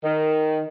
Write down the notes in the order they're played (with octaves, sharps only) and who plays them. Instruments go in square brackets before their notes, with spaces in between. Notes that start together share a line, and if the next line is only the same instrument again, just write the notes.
[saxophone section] D#3